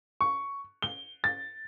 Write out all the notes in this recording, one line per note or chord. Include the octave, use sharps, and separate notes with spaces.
C#6
G7
A6